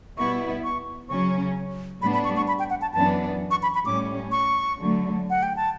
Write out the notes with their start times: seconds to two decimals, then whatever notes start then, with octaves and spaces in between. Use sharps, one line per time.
0.18 B2 G3 B3 E4 C#6
0.64 C#6
1.09 C#3 F#3 C#4 C#6
2.02 A2 G3 B3 D4 B5
2.14 B5
2.24 C#6
2.37 C#6
2.48 B5
2.59 G5
2.70 F#5
2.82 A5
2.93 F#2 E3 B3 D4 A5
3.51 C#6
3.63 B5
3.74 B5
3.85 A2 G3 C#4 D6
4.32 C#6
4.78 D3 F#3 A3
5.30 F#5
5.43 G5
5.56 A5